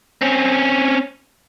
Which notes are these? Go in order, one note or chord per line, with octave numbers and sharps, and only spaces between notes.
C4 C#4